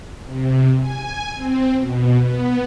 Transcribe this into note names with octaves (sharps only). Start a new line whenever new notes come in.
C3
G#5
C4
B2
B3